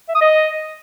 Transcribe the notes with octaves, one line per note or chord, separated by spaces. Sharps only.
E5
D#6
D#5